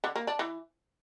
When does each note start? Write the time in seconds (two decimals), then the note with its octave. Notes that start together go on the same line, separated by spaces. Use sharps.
0.04 D3
0.16 A#3
0.27 D4
0.39 E3